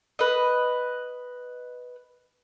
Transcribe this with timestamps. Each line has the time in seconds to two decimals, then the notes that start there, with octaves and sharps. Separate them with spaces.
0.19 B4 D#5